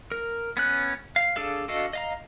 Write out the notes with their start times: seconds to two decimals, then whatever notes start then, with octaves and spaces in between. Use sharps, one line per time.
0.12 A#4
0.57 B3 C#4 F#6
1.16 F5
1.36 D4 G#4 A4 F5
1.68 D4 F#4 A4 D#5 F5
1.93 D#5 F5 A#5